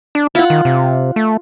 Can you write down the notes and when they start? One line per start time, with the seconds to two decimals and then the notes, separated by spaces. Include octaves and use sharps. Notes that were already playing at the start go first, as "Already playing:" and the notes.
0.15 D4
0.35 E4 F4 F#5
0.50 D#3
0.65 C3
1.16 A3